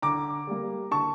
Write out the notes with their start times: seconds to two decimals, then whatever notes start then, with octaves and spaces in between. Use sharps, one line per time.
0.02 D3 A#5 D6
0.47 G3 A#3
0.91 D3 A5 C#6